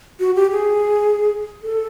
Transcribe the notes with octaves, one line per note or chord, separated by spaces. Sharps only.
F#4
G4
G#4
A4